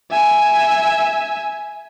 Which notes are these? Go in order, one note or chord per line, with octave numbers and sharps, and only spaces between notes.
E5 G#5